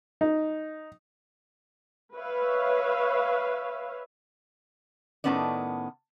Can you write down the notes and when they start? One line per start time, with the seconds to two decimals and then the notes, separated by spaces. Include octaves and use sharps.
0.21 D#4
2.16 B4 C#5 E5 F5
5.24 A2 D#3 A3 B3 C#4 D5